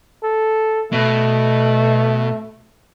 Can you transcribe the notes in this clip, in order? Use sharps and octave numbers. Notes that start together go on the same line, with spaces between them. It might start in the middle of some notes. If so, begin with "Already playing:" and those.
A4
B2 A3